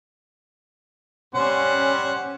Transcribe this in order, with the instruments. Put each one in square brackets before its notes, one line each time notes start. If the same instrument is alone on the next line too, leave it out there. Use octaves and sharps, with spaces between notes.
[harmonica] G3 C5 F#5 [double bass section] C#4